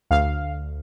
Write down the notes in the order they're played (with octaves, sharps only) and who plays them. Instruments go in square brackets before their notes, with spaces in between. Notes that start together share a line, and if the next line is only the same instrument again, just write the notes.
[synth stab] D2 F5